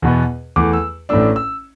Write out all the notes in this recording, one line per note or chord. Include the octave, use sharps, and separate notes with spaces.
E2 B2 B3
E2 E3 A3 D6
E6
A1 A2 A3 D4 E6
E6